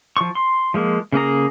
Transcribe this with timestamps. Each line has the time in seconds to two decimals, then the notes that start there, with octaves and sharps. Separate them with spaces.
0.17 F3 C#6
0.35 C6
0.74 F3 G#3 A#3
1.12 C#3 A#3 G#4 A#5